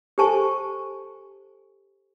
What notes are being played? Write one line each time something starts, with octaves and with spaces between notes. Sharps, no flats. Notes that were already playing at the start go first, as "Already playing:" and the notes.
G4 A4 C5 G#5 A5 C#6